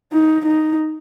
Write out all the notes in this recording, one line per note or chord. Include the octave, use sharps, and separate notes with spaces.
D#4
D#4